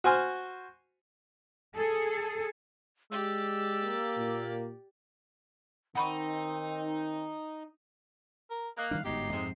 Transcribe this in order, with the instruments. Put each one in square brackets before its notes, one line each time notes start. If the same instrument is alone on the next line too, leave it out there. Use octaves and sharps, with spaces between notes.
[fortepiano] F#4 C5 G#5 F6
[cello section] G#4 A4
[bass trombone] G#3 [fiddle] G4 D5 [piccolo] E6
[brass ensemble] A#3
[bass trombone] A#2
[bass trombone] D#3 [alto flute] C4 [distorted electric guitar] D#4 [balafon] F#5 B5 C#6
[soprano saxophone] A#4
[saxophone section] A#3 [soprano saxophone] D#5 [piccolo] F#6
[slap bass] D#3 G3 D4 [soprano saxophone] F5
[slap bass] G1 G#2 B3 [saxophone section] F#3 G4 [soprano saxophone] D#4 [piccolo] C7
[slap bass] F2 G#2 C4 [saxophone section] C3 G#3